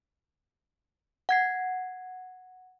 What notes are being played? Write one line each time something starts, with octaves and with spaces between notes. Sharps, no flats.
F#5 G#6 C7